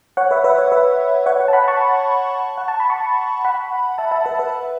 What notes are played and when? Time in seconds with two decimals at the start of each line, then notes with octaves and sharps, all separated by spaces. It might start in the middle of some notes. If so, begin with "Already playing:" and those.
0.17 C#5 F#5
0.31 B4 E5
0.44 B4 E5
0.58 C#5
0.72 B4 E5
1.26 C#5 F#5
1.40 C#5 F#5
1.48 A5
1.53 F#5 B5
1.68 A5 C#6
2.58 F#5
2.68 A5
2.80 B5
2.90 A5 C#6
3.45 F#5 B5
3.98 E5 A5
4.11 E5 A5
4.25 B4 E5
4.39 B4 E5